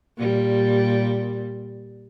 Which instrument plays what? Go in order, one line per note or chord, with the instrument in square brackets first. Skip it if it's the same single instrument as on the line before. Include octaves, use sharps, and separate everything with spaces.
[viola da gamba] A#2 G3